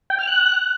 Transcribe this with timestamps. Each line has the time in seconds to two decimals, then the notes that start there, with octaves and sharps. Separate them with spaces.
0.10 G5
0.19 F6
0.27 F#6